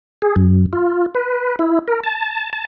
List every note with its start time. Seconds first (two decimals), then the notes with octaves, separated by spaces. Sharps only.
0.22 G#4
0.36 F#2
0.73 F4
1.15 B4
1.59 E4
1.88 A#4
2.04 A5
2.53 A5